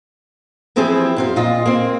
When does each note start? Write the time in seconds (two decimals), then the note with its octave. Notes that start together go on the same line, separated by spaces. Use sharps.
0.76 E3 F3 C4 E4 G4 G#4
1.16 F#2 C4 F5
1.36 A#2 F4 D#5
1.65 A#3 C4